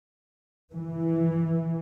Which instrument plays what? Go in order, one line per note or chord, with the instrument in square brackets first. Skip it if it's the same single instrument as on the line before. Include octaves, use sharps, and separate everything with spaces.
[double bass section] E3